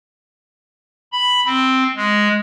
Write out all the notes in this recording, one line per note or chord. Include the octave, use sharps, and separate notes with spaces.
B5
C4
G#3